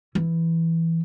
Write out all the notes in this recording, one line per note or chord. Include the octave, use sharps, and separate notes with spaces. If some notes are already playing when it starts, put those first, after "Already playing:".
E3